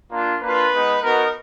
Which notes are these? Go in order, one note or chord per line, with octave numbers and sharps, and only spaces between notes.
A#3 D4 F4
A#3 D4 F4 B4
G#3 B3 D#4
B3 D#4 F#4 A#4